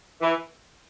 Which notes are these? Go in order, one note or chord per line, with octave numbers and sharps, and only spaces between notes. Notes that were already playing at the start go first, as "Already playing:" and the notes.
E3